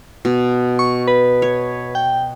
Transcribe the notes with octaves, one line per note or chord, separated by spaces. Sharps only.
B2
C#6
B4
C#5
G5